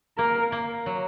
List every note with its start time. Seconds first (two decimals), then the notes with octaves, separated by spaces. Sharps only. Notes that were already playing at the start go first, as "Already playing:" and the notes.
0.18 A#3 A#4
0.52 A#3
0.86 F#3